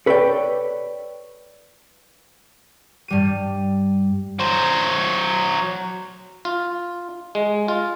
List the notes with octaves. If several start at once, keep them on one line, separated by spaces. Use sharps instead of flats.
A4 B4 C#5 D5 F#5 G5
G2 G3 D#7
F#3 C5
F4
G#3
F4